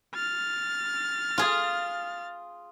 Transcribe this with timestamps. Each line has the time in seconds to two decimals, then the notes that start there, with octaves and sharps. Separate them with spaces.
0.15 F6 A6
1.38 F4 G#4